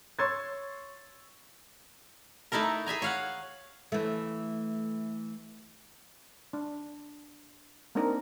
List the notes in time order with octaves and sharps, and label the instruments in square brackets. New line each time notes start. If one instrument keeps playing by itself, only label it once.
[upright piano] C#5 C6 C#6 E6 G#6 A6
[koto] A3 D#4 E4 A4 A#4
G#4 E5 G#5 A#5
C#5 F5 F#5
[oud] E3 A3
[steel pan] D4
A#3 C4 D4 D#4 A#4